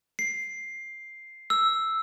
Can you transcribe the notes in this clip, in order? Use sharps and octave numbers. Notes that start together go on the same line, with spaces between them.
C7
E6